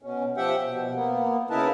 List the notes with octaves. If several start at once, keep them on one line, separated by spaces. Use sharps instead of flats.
B2 C#4
F3 G4 E5 F#5 G5
B2
A#3 B3
C#3 D#4 E4 A#4 B4 A5